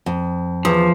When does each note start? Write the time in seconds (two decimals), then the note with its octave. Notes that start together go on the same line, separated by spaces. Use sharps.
0.06 F2
0.65 E2 F3